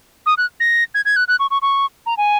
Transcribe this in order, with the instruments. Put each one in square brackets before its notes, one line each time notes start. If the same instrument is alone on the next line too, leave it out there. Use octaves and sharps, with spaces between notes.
[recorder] D#6
F#6
A#6
G#6
G#6
F#6
F#6
C#6
C#6
C#6
A#5
G#5